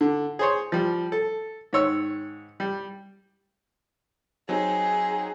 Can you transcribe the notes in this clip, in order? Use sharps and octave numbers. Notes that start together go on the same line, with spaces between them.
D3
G#4 C5 C#5
F3 G3
A4
G#2 D#3 C#5 E6
G3
F#3 C4 D#4 G#4